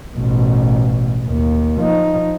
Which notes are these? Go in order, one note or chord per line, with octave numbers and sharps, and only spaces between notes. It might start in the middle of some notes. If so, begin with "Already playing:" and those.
A1 B2
D#2
F3 D#4